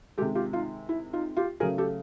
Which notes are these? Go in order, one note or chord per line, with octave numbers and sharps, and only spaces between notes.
C3 D#3 G#3 G4 A4
F4 G4
D#4 F4
E4
D#4 F4
F4 G4
C#3 F#3 A3 G#4 A#4
G4 A4